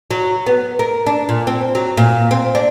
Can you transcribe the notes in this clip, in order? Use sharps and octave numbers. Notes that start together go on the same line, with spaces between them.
F#3
B3
A#4
D4
A#2
C4
F#3
A#2
C4
D4